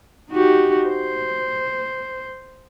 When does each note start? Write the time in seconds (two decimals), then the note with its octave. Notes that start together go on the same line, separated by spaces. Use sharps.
0.31 D#4 F#4 G4
0.89 C5